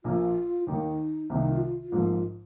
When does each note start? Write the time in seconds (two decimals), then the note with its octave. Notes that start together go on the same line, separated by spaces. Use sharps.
0.04 A#1 A#2 A#3 F4
0.67 D#2 D#3 A#3 D#4
1.29 C2 C3 D#3 A#3 C4
1.40 D#4
1.51 F4
1.61 F4
1.82 F4
1.92 A#1 G#2 F3 A#3